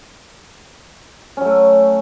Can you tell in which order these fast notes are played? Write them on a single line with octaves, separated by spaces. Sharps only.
C#4 F#3 A3